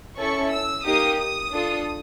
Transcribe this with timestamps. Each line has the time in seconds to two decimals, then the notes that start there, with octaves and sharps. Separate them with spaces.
0.18 C#4 E4 A4 C#6
0.51 E6
0.85 A#3 D#4 G4 D#6
1.19 D#6
1.52 D4 F4 A4